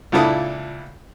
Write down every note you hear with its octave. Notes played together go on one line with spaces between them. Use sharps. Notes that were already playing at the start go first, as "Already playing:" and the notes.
C#2 A#2 D4 E4 A4 D#6